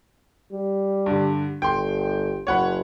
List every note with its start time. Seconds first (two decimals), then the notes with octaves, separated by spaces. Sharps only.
0.52 G3
1.06 G2 D3
1.62 G1 G5 C6
2.47 F#1 C#5 F#5 B5